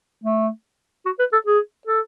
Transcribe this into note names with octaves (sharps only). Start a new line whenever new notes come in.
A3
F#4
B4
A4
G#4
A4